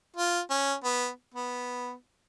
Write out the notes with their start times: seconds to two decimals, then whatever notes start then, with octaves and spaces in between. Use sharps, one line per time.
0.17 F4
0.50 C#4
0.84 B3
1.34 B3